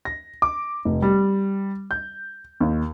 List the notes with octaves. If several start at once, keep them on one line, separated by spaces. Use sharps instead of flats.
A#6
D6
F1
G3
G6
D#2